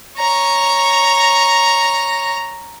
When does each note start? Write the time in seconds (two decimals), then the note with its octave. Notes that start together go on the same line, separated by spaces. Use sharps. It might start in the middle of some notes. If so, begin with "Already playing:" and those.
0.19 C#5 A#5